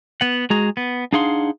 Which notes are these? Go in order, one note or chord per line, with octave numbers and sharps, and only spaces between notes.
B3 F#5
G#3 F#4 G#4 A#5
B3
D4 D#4 G#4 F5 F#5 C6